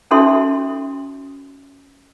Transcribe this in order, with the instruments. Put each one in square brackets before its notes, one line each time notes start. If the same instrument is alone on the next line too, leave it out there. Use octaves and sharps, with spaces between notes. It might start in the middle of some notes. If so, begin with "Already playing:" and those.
[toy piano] C#4 D#4 F#4 A4 E5 C6